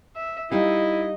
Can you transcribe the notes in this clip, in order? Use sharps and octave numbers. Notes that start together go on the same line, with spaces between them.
E5
G3 D#4 E4 D#5 F5